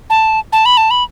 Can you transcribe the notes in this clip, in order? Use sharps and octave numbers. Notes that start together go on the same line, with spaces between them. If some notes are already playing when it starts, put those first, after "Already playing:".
A5
A5
B5
A5
B5